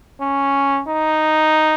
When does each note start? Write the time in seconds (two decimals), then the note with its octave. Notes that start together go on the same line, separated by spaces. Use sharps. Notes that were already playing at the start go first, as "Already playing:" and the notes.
0.20 C#4
0.88 D#4